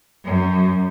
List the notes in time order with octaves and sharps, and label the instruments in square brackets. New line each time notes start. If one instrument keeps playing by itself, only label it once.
[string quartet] F#2